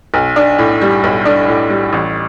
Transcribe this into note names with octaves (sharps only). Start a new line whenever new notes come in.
B1
D4
A2
G3
B1
D4
A2
G3
A1